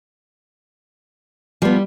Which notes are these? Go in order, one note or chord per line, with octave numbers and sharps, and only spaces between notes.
F3 G3 B3